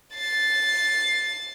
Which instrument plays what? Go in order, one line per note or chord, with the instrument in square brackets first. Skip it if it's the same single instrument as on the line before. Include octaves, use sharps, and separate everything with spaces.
[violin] A6 C7